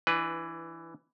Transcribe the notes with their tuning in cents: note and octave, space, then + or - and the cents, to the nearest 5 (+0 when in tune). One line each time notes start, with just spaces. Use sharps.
E3 +10 D4 +30 B4 +0